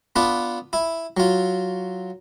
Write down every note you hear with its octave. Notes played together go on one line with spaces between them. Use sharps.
B3 D4 F4 B4
E4
F#3 F4